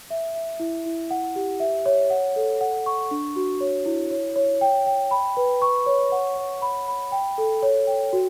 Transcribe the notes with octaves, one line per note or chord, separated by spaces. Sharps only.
E5
E5
E4
E4
F#5
G4
E5
C#5
F#5
A4
F#5
C#6
D4
F#4
C#5
E4
C#5
C#5
G5
G5
B5
B4
C#6
C#5
F#5
C#5
B5
B5
G5
A4
C#5
G5
F#4